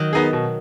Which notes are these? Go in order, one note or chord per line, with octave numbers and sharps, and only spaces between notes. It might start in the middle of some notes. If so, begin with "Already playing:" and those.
Already playing: D#3 F#3
B3 D#4 G#4
B2